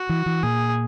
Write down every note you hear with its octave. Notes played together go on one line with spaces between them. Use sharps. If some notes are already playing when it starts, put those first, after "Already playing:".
Already playing: F#4
E3
E3
A#2 G#4